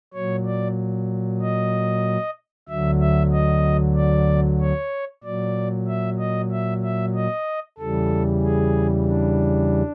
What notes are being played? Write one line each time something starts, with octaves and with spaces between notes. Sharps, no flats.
A#2 F#3 C#5
D5
D#5
D2 D3 F#3 E5
E5
D#5
D5
C#5
A#2 F#3 D5
E5
D#5
E5
E5
D#5
E2 C#3 E3 G3 A4
G#4
D4